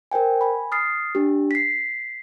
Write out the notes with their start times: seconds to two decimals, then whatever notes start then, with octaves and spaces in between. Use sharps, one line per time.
0.11 A#4 C5 G5 G#5
0.41 G#5 B5
0.72 D#6 F6 A6 C7
1.15 D4 G4
1.51 B6 C7